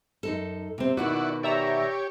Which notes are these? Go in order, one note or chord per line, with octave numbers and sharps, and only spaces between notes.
F#2 D#4 A4
C3 C4
B2 D#3 E4 F#4 D5 F#5
G4 C#5 D5 E5 A#5